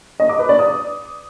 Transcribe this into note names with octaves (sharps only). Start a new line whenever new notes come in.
D#5
D6
B4
D5
D#6